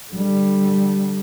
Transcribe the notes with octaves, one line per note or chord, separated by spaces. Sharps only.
D3 G3